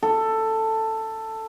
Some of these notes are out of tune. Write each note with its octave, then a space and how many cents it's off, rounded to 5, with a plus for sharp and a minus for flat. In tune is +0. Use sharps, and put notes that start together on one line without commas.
A4 +10